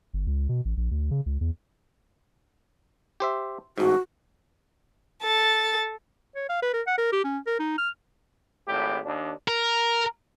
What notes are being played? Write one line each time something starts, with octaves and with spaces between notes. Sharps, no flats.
G1
C#2
B2
A1
A#1
D2
C#3
C#2
E2
G4 C5 E5
A1 G#2 F#4
A4 A6
C#5
F5
B4
A#4
F#5
A#4
G4
C#4
A#4
D#4
F6
G#1 A2 G4
D#2 D4
A#4